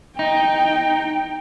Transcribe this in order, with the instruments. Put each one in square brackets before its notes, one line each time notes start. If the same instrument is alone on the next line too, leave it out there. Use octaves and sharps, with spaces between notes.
[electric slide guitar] D#4 [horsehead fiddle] G5